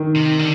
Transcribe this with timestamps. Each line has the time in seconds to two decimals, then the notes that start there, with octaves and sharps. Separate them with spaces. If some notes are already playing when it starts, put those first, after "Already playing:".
Already playing: D#3
0.16 C3
0.39 D3